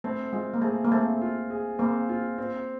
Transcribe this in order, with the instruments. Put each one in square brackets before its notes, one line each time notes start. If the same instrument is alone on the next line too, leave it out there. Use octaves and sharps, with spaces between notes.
[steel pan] A3 [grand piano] C4
[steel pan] G#3 [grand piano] F4
[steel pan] A#3
[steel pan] A3 [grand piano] G#4
[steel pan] A#3
[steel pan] A3 [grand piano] C4
[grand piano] F4
G#4
[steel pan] A#3 [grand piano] C4
[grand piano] F4
C4